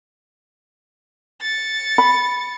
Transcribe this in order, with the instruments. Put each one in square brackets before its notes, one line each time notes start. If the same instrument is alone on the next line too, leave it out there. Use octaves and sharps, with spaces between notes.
[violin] A6 C#7
[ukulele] B5